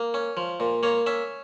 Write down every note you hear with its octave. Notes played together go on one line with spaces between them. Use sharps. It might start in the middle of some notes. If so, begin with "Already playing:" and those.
Already playing: A#3
C#4
F3
A#2
A#3 C#5
C#4 E5